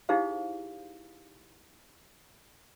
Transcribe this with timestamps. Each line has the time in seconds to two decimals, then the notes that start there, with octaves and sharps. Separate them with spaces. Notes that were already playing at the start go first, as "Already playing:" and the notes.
0.09 D#4 E4 G4 G#4 C5 F5